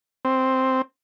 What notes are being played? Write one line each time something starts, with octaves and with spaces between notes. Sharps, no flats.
C4